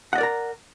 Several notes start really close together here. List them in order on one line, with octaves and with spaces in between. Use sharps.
F#5 D#5 D5 A#4 A#5